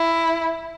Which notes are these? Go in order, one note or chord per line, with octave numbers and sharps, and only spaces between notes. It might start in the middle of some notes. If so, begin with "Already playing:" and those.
Already playing: E4